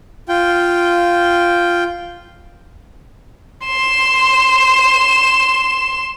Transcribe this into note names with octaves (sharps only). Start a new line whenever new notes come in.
F4 G5
C6 E7